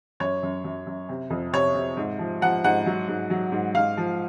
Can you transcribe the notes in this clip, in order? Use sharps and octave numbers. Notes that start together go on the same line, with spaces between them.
F#2 C#5
F#2
F#2
F#2
C3
F2
C3 C#5
C3
G#2
F3
F3 F#5
G#2 F#5
F#3
G#2
F#3
G#2
G#2 F5
F3